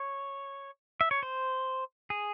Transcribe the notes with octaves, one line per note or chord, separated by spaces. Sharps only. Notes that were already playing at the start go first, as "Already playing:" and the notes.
Already playing: C#5
E5
C#5
C5
G#4